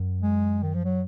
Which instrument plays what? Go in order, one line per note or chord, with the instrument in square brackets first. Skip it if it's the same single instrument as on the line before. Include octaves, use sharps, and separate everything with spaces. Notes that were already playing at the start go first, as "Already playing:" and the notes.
Already playing: [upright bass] F#2
[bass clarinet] G#3
D#3
F3
F#3